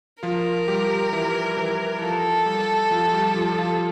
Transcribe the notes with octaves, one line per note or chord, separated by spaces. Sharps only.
F3 F4 A#4
G3 G4
E3 E4
E3 E4
F3 F4 A4
G3 G4
F3 F4
G3 G4
F3 F4
F3 F4